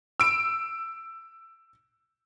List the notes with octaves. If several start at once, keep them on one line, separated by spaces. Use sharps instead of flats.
E6 D7